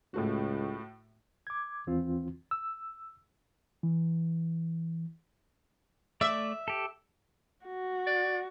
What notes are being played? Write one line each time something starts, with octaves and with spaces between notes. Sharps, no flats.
C#2 A2 A3 F#4
D6 G#6
D#2 E3 C4 F4
E6
E3
A3 D5 E5 D6
G4 A4
F#4
D5